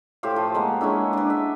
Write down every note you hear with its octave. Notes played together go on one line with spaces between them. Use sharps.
A2 G4 C5 F5
F3
G#3 A#3 B3
G#3 C#4 D4 E4
D4 B4
E5